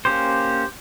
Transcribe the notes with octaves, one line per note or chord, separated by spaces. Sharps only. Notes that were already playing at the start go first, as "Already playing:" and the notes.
A#3 C#4 G4 C5